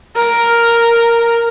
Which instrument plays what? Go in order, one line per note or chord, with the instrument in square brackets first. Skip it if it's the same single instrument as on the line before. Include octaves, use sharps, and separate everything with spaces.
[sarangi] A#4